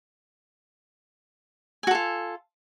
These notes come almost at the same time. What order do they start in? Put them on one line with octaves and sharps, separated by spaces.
G#5 F#4 A4 F4